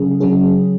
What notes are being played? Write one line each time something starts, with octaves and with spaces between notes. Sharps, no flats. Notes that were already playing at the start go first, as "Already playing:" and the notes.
Already playing: C#3 F#3 C#4 G#4
C#3 F#3 C#4 G#4